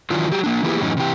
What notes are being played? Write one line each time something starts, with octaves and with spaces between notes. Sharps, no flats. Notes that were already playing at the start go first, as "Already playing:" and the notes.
D#3 E3 F#3 D4 F4
F#3 G4
A#3 D4
E3 A#3 B3 E4 G4 G#4
F#2 A2 E3 C#4 D#4
C3 E3 G4